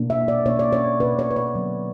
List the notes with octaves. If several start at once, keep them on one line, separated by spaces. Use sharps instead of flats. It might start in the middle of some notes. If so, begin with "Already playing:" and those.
Already playing: B2 A#3 D4
E5
D5
B2 A#3 D4 C#5
D5
C#5
B2 A#3 D4 B4
C#5
B4
C#5
D3 F#3 B3